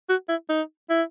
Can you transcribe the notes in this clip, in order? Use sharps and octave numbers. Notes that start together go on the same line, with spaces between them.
F#4
E4
D#4
E4